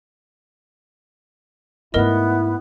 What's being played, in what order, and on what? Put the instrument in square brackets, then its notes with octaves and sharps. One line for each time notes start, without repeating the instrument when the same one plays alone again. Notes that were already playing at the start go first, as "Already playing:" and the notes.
[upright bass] G#2 A3 [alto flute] B3 [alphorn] E4 [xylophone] A#4 D#5